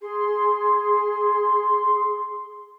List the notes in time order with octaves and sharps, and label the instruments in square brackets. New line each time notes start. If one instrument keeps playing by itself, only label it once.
[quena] G#4 [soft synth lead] C6